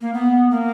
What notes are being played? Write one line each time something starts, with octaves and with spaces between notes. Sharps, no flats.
A#3
B3
A#3